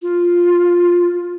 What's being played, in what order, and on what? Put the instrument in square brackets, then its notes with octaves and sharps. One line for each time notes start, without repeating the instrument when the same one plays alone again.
[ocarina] F4